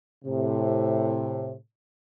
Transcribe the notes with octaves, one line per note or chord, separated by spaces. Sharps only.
A2 C3